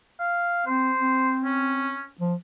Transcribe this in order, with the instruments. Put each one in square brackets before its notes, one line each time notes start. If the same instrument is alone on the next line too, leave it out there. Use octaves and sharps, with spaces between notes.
[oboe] F5
[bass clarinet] C4 [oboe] C5
[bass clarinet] C4
[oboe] C#4
[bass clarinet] F3